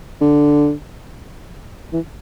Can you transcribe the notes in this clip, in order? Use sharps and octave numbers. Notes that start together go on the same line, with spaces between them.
D3
E3